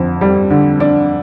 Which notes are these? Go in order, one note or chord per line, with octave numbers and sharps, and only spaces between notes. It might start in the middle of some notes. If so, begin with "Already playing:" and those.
Already playing: F2 D3
G3
D3
D4